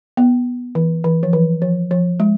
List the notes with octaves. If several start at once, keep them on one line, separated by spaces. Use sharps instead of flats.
B3
E3
E3
F3
E3
F3
F3
G#3